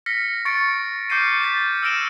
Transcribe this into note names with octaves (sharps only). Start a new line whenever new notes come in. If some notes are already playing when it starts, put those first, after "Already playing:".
F6 A#6 B6 C#7
C#6 A6 C#7 D7
D6 F6 G6 C7 C#7 D#7
A6 B6 C7 E7
E6 F6 A#6 D7 E7 G7